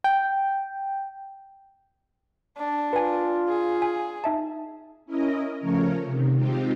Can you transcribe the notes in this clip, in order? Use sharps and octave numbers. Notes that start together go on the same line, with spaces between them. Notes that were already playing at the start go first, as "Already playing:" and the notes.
G5
D4
F4 B4 G#5
G#4
G#5
D#4 E5 A5
C#4 E4 A#4 D#5
C#3 F3 A3 C#4 A#4 C#5
C3 D#3
G#3 C4 D#4 F4 G4